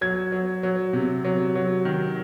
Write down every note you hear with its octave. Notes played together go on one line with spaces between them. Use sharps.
F#3 G#6
F#3
F#3
C3
F#3
F#3
D#3